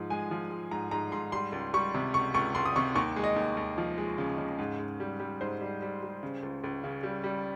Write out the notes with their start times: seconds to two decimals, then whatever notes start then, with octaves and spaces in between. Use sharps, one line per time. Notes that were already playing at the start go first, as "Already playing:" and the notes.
Already playing: G#2 F3
0.10 G#3 G#5
0.31 F3
0.50 G#3
0.71 G#2 A#5
0.91 G#2 A#5
1.12 G#2 C6
1.32 G3 C6
1.52 C#2
1.74 G3 C#6
1.94 C3
2.14 C#2 C#6
2.34 C#2 C#6
2.55 C#2 C6
2.66 D#6
2.76 C3 C#6
2.95 D#2 C#6
3.16 G#3
3.24 D#5
3.36 D#2
3.57 D#2
3.78 F3
3.98 G#3
4.18 C#3
4.38 C#3
4.59 G#2
4.79 G#2
5.00 G3
5.20 G3
5.41 G#2 C5
5.61 G3
5.82 G3
6.02 G3
6.23 C#3
6.43 C#2
6.64 C#2
6.84 C#3
7.03 G3
7.24 G3